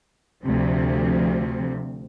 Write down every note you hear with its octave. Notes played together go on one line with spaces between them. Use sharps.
D2 C3 F3 C4